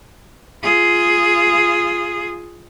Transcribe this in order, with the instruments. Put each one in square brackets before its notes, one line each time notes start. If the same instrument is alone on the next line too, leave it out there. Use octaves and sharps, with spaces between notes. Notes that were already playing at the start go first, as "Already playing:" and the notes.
[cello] F4 G#4